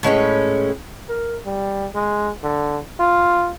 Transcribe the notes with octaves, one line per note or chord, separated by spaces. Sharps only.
A2 G#3 C#4 B4
A#4
G3
G#3
D3
F4